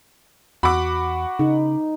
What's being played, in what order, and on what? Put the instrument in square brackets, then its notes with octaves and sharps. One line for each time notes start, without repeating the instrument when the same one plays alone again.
[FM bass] E2 [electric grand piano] F#4 F#5 [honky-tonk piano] B5 D6
[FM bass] C#3 [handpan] D#4